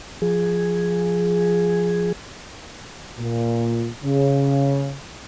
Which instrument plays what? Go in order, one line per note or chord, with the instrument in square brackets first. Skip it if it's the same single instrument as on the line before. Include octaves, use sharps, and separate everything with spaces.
[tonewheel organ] F3 G#4
[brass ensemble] A#2
C#3